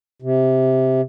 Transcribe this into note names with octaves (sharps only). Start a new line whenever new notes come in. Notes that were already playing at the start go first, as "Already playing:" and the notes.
C3